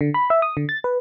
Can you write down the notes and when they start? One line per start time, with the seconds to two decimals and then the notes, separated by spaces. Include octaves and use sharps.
0.01 D3
0.14 B5
0.30 E5
0.42 D#6
0.57 D3
0.69 A6
0.84 B4